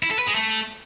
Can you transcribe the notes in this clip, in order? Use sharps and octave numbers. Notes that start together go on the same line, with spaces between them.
E4
A4
B4
G#3
A3